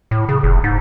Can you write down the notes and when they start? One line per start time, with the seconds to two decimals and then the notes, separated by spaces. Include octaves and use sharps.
0.11 A2
0.29 C#3
0.43 F1
0.64 G#2